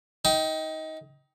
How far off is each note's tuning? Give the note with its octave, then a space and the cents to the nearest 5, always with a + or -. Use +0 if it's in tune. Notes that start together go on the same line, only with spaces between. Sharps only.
D#4 +25 G5 -10